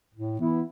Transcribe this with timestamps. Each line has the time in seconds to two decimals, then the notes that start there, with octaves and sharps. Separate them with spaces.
0.15 A2
0.38 E3 B3 E4